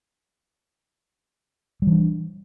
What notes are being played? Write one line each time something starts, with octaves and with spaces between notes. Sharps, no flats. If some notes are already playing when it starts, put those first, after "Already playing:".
E3 G3 D4